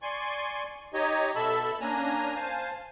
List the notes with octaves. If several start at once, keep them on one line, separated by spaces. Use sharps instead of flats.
D5 G#5 C6 C#6
D#4 G4 C#5 D#5
B2 A4 E5 A5 B5 E6
A#3 C#4 D4 G#5 A#5
C5 F5 G#5 A5